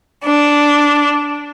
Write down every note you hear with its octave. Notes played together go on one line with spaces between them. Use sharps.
D4